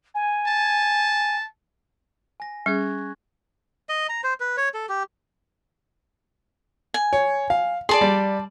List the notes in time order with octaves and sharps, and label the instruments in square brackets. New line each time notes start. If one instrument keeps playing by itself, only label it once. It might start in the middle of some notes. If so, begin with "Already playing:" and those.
[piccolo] G#5
[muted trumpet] A5
[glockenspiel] G#5 A#6
[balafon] G3 [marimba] C#4 G#4 [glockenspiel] C#6 F#6 G#6
[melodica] D#5
A#5
C5
B4
C#5
A4
G4
[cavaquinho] G#5
[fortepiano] C#5
F5
[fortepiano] G#4 [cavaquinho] D5 A5 C6
[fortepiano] G3